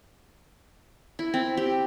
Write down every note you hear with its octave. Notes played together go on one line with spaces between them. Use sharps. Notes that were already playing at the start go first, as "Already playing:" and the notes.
E4
C4
G4